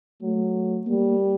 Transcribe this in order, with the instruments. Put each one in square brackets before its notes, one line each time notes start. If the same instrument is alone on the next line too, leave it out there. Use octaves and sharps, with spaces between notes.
[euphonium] F#3 [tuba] A3
[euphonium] G3 [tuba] A#3